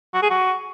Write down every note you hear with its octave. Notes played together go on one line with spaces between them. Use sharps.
F#4
G#4
F#4